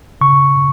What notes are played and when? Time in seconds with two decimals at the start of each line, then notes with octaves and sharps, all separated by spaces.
0.21 C#3 C#6